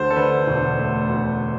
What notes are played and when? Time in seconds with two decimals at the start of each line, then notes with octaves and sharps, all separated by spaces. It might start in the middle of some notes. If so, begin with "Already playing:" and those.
Already playing: D2 A3 C5
0.10 A4
0.16 D3 B4
0.47 E1
0.79 A3
1.10 D2